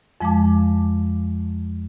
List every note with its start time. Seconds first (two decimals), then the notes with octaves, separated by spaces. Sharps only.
0.20 F2 F3 G#3 F5 A5 D6